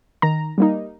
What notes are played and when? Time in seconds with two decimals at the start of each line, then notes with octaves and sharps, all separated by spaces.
0.22 D#3 A#5
0.58 G3 A#3 D#4